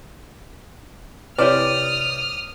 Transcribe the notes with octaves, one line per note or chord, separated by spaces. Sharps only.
C3 E4 G4 B4 C#5 D5 D#6 F6